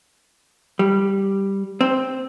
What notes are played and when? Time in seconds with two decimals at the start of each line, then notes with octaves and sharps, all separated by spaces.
0.79 G3
1.81 C4